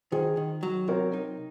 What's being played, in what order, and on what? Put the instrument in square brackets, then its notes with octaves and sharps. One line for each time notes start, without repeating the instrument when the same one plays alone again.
[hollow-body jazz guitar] D#3 [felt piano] G#4 C5
[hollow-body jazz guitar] D#3
F#3
[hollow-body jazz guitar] C3 [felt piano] A#4 C#5
[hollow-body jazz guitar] D#4